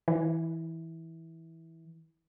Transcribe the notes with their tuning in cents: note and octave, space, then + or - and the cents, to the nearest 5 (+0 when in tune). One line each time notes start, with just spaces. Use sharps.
E3 -15